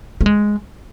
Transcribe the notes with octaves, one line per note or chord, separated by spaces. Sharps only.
A3
G#3